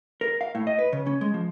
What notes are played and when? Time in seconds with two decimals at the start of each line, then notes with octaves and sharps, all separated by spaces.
0.21 A#4
0.41 F5
0.55 A2
0.67 D#5
0.79 B4
0.93 C#3
1.07 C#4
1.21 G#3
1.34 F3